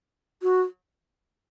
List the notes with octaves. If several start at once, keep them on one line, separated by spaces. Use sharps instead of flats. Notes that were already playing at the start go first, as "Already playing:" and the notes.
F#4